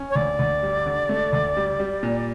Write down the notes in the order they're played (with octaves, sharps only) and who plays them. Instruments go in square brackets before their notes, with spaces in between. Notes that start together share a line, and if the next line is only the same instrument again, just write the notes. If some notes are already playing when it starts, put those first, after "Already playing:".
Already playing: [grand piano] C#4
[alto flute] C#5
[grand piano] D2 [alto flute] D5
[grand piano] D2
G3
D3
A3
D2
G3
G3
A#2